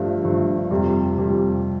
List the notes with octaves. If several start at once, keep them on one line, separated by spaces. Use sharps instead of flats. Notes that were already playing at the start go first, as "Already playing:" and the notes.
Already playing: G2 F3 A3
G2 F3 A3
F2 C3 G3
F2 C3 G3